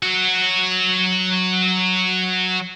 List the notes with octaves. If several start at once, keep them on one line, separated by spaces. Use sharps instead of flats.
F#3 F#4